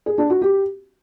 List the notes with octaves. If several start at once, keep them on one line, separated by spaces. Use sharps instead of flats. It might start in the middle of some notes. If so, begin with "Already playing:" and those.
G#4
D4
F#4
G4